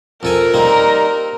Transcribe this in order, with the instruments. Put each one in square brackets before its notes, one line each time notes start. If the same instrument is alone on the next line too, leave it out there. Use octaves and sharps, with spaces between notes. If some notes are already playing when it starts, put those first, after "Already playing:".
[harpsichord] F2 A4 G#5 [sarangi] A#4
[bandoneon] G3 D#4 [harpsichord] A#3 C4 [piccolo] A#5